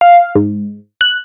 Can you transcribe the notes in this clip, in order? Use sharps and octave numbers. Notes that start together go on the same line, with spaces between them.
F5
G#2
F#6